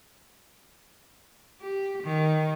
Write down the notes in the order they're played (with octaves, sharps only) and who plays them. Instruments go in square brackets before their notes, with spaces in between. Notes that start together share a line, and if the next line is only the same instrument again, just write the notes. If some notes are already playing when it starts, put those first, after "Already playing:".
[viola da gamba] G4
D#3